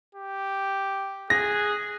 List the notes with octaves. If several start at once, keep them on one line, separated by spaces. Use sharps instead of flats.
G4
G#4 F#6 A#6